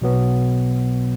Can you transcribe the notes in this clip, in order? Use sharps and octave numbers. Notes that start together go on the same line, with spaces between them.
B1 B2 F#3 B3